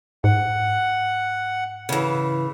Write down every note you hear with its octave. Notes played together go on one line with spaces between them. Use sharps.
G#2 F#5
C#3 E3